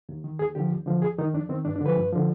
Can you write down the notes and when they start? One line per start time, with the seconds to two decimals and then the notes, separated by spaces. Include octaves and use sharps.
0.09 D#2
0.24 D#3
0.39 D#2 G#4
0.55 D3 F3 G4
0.71 D#2
0.86 D3 F3
1.02 F2 G#4
1.19 D#3 D#4
1.33 F2 D4
1.49 D#3 C4
1.65 G2 D4
1.76 D4
1.81 D3
1.86 F3 B4
1.96 G2
2.12 D3 F3